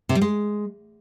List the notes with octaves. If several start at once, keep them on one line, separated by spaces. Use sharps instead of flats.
C3
G3
G#3